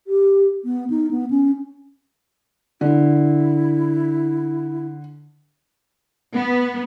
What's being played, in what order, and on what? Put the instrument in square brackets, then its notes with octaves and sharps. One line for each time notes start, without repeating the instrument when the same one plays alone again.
[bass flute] G4
B3
D#4
B3
C#4
[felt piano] D3 [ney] E4
[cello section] B3